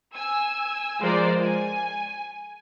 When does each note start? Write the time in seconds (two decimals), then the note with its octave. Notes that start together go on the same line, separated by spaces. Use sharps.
0.15 G#5 E6
1.00 F3 G#3 F4 A#4 C5 D5
1.41 G#5